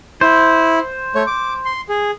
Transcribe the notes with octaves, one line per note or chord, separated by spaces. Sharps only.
E4 C5
A3 C#5
D6
C6
G#4